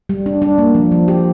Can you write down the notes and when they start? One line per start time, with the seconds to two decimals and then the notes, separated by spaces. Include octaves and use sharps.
0.09 G3
0.26 D4
0.42 D4
0.58 A#3
0.75 F3
0.92 F3
1.08 G4